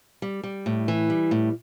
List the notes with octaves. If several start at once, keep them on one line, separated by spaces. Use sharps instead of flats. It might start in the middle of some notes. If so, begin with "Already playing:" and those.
G3
G3
A2
E3
G3
A2